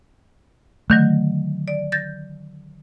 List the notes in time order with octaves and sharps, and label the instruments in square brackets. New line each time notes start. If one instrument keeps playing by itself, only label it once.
[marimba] D3 D#3 F#3 [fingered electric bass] A3
[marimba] D5
G6 A6 A#6